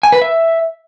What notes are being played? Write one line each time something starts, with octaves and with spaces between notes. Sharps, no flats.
G#5
B4
E5